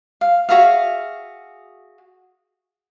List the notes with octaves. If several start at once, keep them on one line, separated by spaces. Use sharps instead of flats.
F5
F#4 G#4 E5 F5